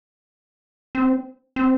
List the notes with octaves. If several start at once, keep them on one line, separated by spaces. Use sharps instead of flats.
C4
C4